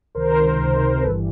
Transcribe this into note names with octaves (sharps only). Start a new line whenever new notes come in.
C#2 C3 D#3 A#4 C5
C#2 C3 D#3
G1 G2 E3 G3 A4 B4